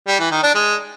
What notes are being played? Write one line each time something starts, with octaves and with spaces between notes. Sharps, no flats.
G3
E3
D#3
D4
G#3